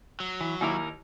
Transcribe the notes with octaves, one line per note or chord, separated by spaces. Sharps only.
F#3
E3
D#2 D#4 E4 A#4 D6